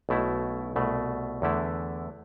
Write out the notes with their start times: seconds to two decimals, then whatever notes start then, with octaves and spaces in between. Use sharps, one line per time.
0.09 B1 B2 A3 E4
0.76 C2 B2 A3
1.42 E2 D3 A3 E4